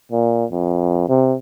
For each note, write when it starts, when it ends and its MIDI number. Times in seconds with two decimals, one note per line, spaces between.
0.12 0.45 46
0.51 1.04 41
1.09 1.36 48